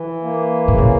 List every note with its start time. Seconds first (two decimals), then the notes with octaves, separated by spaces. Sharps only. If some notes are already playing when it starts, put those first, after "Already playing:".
Already playing: E3
0.23 A#3
0.68 A2 C#3
0.78 A#2